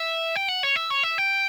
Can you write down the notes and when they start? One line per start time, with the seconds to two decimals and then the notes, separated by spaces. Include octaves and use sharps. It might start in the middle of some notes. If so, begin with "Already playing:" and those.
Already playing: E5
0.36 G5
0.48 F#5
0.63 C#5
0.76 E5
0.90 C#5
1.03 E5
1.18 G5